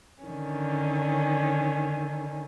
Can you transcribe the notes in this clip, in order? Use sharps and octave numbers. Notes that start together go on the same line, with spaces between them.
D3 D#3 C#4